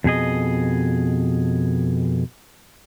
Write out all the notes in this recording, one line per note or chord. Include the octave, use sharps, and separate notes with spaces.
F2 B2 G#4 D#5